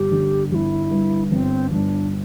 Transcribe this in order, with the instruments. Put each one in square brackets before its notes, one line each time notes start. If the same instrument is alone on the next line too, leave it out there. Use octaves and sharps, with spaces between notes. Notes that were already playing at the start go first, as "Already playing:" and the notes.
Already playing: [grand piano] G1 [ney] G4
[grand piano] D3
[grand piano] G1 [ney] E4 G4
[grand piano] G2
[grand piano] G1 [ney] C4
[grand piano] G1 [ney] D4